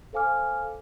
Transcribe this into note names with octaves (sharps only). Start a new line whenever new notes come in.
A4 C5 F5 G#5 D6 F6